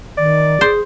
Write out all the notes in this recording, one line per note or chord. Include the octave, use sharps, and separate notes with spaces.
D#3 D5
G#4 C5